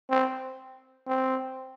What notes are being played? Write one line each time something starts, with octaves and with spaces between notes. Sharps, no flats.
C4
C4